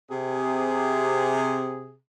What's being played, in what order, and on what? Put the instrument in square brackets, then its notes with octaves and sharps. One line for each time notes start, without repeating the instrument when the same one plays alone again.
[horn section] C3 G#4